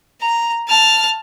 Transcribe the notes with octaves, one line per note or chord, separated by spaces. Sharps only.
A#5
A5 F6